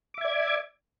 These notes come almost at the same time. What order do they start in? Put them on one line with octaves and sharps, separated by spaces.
D6 E5 G#6 D5